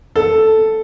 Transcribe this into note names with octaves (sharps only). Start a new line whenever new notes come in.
A4